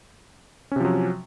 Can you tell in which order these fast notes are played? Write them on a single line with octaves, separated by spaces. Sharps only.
C#4 C3 F3 F#3